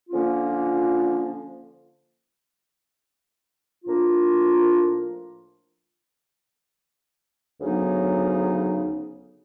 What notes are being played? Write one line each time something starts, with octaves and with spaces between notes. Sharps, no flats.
D3 F3 A#3 C#4 F4
A2 F3 A#3 D4 F4
D2 C#3 F#3 B3 D#4